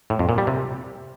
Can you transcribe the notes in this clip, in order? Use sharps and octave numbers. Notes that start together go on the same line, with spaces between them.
A2
F2
A#2
G3
C3